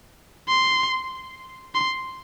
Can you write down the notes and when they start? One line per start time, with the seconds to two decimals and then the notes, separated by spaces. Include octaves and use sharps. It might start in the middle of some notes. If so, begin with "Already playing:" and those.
0.48 C6
1.75 C6